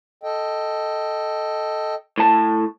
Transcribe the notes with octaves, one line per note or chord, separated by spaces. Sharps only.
A4 D#5 G5
A2 A5